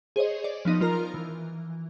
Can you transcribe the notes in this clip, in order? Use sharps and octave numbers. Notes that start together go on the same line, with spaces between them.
G#4 C5 C#5 D#5
D5
F3 B3 D#4 D#5
F3 F4 A#4 A#5 F6
E3